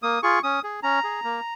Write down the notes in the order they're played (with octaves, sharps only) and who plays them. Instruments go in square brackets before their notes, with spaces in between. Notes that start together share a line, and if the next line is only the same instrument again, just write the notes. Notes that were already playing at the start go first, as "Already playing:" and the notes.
[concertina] A#3 D#6
F4 G#4 C#6
C#4 D#6
G#4
C#4 A#5
G#4
A#3